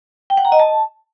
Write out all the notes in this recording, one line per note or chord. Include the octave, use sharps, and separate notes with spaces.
G5
F#5
A#5
D#5
A5